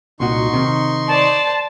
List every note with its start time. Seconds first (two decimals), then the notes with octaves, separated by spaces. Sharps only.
0.20 C2 A#2 D#4 F#4 C6 C#6
0.53 C3 D#3
1.08 C5 D5 A5